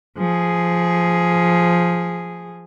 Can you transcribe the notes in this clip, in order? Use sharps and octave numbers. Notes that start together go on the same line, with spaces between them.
F3 G#4